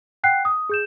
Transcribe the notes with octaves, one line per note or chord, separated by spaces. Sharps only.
F#5 G5 F#6 C7
D#6
G#4 G6 E7